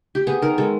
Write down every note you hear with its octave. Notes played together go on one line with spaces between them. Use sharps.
G4
B3 G#4
D#3 A#4
G#3 A4